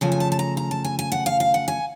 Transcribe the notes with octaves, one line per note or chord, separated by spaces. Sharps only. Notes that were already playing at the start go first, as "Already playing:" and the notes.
C#3 F3 A3 G#5
G#5
A5
A5
A#5
A#5
A5
G#5
G#5
F#5
F5
F5
F#5
G#5